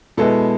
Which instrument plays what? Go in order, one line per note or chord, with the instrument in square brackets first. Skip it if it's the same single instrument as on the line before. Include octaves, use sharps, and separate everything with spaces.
[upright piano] B2 G#3 B3 E4 A4